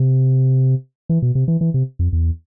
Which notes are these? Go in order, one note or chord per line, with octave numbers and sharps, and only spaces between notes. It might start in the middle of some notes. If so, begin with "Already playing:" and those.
Already playing: C3
E3
B2
C3
E3
E3
C3
F2
E2